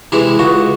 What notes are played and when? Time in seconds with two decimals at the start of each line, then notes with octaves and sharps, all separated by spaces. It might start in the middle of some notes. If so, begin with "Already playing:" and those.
0.12 C3 E3 G#3 E4
0.39 C#2 F#4